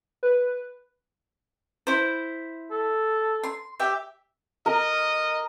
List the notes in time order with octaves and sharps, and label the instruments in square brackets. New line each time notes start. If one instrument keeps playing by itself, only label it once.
[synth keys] B4
[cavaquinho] E4 C5
[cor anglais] A4
[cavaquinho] C6
G4 E5 G5
[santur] A#4 [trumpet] D#5